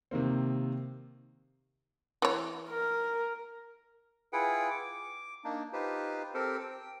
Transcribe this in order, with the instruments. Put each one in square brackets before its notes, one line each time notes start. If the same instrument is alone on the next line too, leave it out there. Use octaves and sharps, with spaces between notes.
[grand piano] C3 D#3 A#3 C4
[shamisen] E3 C#5
[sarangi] A#4
[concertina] E4 F4 G#4 B4 F#5 G5
D6
A#3 D4 D#4
D#4 F4 G4 B4 C5
C4 G4 A4 A#4 C5
G5